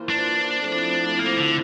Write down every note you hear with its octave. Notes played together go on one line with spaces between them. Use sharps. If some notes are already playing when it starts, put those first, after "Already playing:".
Already playing: E3 A#3 F4 C5
D4
F3 A3 C4 E4
A#3
D3